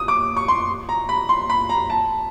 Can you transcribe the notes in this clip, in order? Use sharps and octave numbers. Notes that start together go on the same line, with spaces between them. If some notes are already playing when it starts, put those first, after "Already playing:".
Already playing: D#6
D6
C#6
C6
A#5
B5
C6
B5
A#5
A5